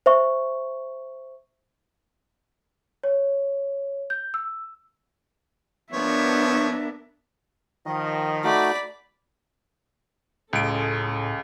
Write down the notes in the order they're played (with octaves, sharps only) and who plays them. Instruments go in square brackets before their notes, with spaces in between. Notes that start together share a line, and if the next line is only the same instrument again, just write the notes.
[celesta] C5 E5 C#6
C#5
G6
E6
[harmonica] F3 C#5 [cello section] B3 A#4 [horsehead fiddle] D4 E5
[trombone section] D#3 F3 [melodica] D#5
[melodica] A3 D#4 F#4 [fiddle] D5 B5
[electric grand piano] C#2 D7 [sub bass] A2 [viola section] G#3 C#4 A4